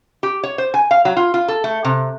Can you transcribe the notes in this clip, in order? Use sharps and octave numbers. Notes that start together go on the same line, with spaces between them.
G4
C#5
C5
G#5
F5
F#3
F4
F4
A4
A3
C3